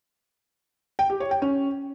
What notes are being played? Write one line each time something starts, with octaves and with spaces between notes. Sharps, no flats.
G5
G4
C#5
G5
C#4